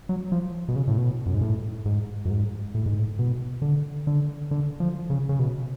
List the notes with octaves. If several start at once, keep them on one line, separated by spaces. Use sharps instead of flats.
F#3
F3
B2
C#3
A2
B2
F#2
G#2
A2
G#2
F#2
G#2
A2
G#2
A2
B2
D3
D3
D3
F3
C#3
C#3
B2